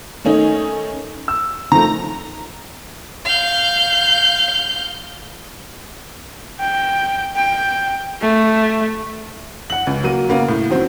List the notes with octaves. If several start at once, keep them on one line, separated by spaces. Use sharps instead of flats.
D#3 A3 C#4 D#4
E6
D#3 F3 A3 A#5
F5 G6
G5
G5
A3
F#5 F#7
C#2
F#3 A#3 D#7
C#3 A#3 B3
A2
D#3 F#3 C4